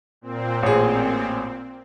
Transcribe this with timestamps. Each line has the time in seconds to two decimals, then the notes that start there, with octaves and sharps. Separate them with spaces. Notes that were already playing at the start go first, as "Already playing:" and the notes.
0.21 A#2 C4
0.63 A1 G#4